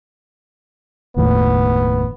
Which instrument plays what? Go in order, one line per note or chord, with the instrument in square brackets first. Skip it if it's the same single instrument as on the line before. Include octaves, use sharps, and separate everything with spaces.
[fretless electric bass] F#1 D#2 A2 [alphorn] B3